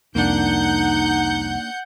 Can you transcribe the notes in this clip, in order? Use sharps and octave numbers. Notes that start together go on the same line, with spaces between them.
C2 F2 A#3 D4 D#4 F#5 G6